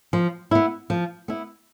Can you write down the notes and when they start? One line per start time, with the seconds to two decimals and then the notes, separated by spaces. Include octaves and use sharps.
0.13 F3
0.51 B3 E4
0.90 F3
1.28 B3 E4